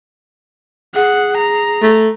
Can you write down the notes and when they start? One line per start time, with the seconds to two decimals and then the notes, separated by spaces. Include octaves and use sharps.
0.95 G#4 F#5
1.37 A#5
1.82 A3